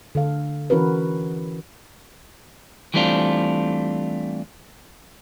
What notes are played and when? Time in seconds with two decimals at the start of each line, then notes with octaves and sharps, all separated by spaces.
0.15 D3 A4 F5
0.70 E3 C#4 F#4 A#4 B4
2.94 E3 G3 A3 C4 D4 F4